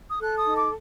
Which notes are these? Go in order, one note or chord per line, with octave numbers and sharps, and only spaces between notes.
D#6
A4 F#6
D#6
D#4
D6